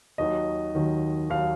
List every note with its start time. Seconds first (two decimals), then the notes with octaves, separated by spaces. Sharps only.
0.18 D#2 D#3 F#3 D#5
0.75 D#2 D#3 F#3
1.30 D#2 D#3 F#3 F5